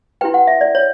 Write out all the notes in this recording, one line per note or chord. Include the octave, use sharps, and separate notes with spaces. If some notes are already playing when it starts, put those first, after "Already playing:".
E4 G4 B4 G5
F#5
E5
D5
C#5